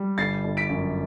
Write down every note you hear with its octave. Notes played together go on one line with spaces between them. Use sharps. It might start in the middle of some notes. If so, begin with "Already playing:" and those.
Already playing: G3
G1 A6 C7
G1
B6 D7
F#2